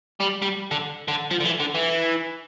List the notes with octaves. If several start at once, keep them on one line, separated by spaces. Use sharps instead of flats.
G3
G3
D3
D3
F3
D3
E3
D3
E3